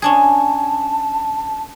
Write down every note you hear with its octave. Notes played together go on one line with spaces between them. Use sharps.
C#4 D4 G#4 A5